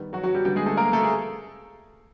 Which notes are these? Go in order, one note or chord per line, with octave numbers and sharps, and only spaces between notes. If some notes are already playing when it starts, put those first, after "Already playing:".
Already playing: D#3 G3 B3
F#3 F#4
F#3 F#4
G3 G4
D3 G3 B3 G4
G#3 G#4
A3 A4
A#3 A#4
A3 A4
G#4